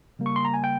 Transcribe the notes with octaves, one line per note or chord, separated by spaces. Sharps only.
C#3 G3 A#3
C#6
C6
A#5
G#5
G5